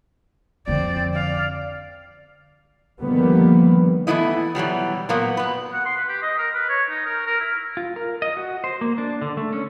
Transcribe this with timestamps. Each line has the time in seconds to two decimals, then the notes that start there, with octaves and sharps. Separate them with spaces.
0.67 F2 D3 C4 D5
1.14 D5 F5
3.00 D3 D#3 F3 G3 A#3 B3
4.07 E3 A3 B3 E4 D#5
4.55 B2 E3 F#3 G3
5.09 A#2 F#3 A#3 B3
5.37 B3 B4
5.73 F#5
5.86 C6
5.97 B4
6.09 G4
6.22 D#5
6.38 A#4
6.54 B4
6.69 C#5
6.89 D#4
7.06 A#4
7.27 A#4
7.40 E4
7.77 F4
7.96 A#4
8.22 D#5
8.37 F#4
8.64 C5
8.81 A#3
8.98 D4
9.22 D3
9.37 A3
9.53 C#4